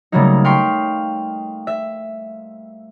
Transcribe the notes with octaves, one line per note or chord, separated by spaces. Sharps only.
C#3 F#3 G3 A3 A#3 D#4
F5 G5 C6 C#6 B6 C7
E5